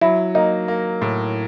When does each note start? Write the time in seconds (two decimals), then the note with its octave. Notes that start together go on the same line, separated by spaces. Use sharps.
0.01 F#3 E4
0.35 A#3 D#4
0.68 A#3
1.02 A2